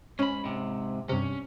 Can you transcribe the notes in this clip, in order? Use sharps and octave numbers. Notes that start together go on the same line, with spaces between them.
G#2 C#4 B5
G#2 C3
G2 C3 C#4